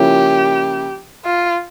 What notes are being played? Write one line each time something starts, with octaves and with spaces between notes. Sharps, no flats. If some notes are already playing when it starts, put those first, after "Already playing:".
Already playing: C#3 F3 A#3 C#4 E4 G4
F4